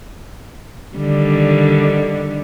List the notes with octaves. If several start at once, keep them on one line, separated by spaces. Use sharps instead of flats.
D3 D#3 G3